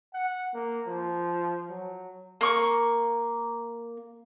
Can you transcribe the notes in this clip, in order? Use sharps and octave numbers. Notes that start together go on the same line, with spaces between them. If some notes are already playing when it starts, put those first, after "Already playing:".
F#5
A#3
F3
F#3
A#3 C#6